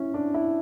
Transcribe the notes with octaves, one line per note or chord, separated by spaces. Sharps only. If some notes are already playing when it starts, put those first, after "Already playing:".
Already playing: C#4 E4
D4
E4